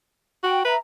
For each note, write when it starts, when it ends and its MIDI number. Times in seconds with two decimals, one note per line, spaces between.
0.43 0.60 66
0.43 0.64 79
0.65 0.75 71
0.65 0.77 76
0.65 0.77 82